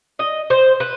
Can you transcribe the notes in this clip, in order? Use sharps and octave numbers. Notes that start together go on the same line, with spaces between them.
D#5
C5
B4